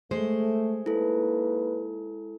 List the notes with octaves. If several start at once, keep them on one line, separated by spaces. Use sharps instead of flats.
G#3 A3 C5
A#3 D#4 E4 A4 B4